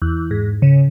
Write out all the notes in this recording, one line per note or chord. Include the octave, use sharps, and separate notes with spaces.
E2
G#2
C#3